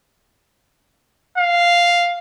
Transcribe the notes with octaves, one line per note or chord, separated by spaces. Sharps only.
F5